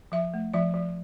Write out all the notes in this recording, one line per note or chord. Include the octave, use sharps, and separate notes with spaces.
F3 E5
A3
F3 E5
F3